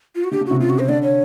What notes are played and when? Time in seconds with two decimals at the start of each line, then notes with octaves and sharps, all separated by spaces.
0.15 F4
0.24 F#4
0.31 D3 G4
0.41 C#3
0.46 C3 F#4
0.60 C#3 F4
0.70 F#4
0.79 C5
0.89 D3 D5
1.03 C#5